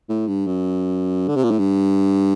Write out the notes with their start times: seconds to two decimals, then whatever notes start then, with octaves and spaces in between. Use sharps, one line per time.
0.09 A2
0.28 G2
0.47 F#2
1.28 D3
1.36 C3
1.43 A#2
1.51 A2
1.59 G2